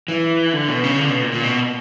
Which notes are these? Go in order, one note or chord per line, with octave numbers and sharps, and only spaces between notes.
E3
D3
B2
C#3
D3
B2
A#2
A#2
B2